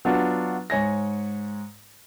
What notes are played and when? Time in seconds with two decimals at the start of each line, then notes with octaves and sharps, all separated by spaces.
0.05 F#3 B3 D4 F4 F#4
0.70 G#2 C#5 G#5 A#6